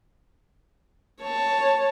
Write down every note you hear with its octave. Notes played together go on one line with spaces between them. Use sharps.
C#5 A5